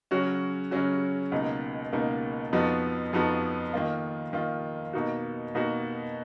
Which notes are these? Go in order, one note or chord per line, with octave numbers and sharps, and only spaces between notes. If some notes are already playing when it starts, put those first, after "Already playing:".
C#3 F#3 C#4 F#4
C#3 F#3 C#4 F#4
C#2 B2 A#3 D#4
C#2 B2 A#3 D#4
F2 F3 B3 D#4 F#4
F2 F3 B3 D#4 F#4
D#3 A#3 F4
D#3 A#3 F4
B2 A#3 D#4 F#4
B2 A#3 D#4 F#4